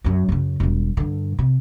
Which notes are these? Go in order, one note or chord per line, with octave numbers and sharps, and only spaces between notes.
F#2 F#3
F#2 C#3
E1 G3
G2 D3
C3